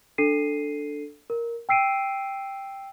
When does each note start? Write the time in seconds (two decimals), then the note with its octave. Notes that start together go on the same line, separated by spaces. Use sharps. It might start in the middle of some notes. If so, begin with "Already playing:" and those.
0.18 D4 A4 C7 D#7
1.30 A#4
1.69 G5 E6 C7 D7 D#7